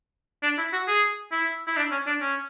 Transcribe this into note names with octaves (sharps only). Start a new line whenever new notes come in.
D4
E4
F#4
G#4
E4
E4
D4
C#4
D4
C#4